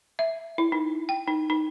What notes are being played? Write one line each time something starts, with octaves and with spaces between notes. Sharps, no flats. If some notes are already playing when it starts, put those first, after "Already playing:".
E5
E4
D#4
G5
D#4
D#4